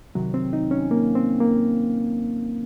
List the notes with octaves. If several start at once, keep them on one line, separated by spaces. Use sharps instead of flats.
C2 C3 D#3 F#3
C4
D#4
C#4
A#3
C4
A#3